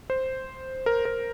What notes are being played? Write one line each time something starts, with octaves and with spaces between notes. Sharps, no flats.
C5
A#4
A#4